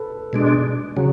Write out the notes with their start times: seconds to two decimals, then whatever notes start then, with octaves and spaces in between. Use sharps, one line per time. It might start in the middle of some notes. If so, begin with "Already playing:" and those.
Already playing: A4 B4
0.33 B2 G#3 D4
0.96 C#3 F#3 G#4